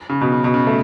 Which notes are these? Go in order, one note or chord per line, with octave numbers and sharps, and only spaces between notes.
C#3
B2
C#3
B2
C#3
A3